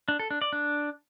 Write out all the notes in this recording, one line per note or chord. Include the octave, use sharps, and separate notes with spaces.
D4
A4
D4
D5
D4